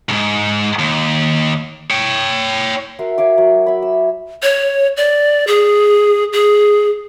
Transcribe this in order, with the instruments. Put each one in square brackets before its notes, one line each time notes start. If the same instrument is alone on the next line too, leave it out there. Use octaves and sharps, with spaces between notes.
[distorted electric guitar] D2 G#2
D#2
C#5 G5
[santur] F#4 A#4 E5 C6
C#5 E5 F5 D6
F#3
E5 B5
E6
[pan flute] C#5
D5
G#4
G#4